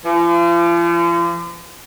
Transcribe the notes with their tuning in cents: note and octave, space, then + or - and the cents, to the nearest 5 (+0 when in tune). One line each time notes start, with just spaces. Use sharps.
F3 -40